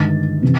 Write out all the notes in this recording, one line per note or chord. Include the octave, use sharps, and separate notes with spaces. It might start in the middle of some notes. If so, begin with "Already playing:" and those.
Already playing: G1 G2 D#3 G#3 A6
C3 E3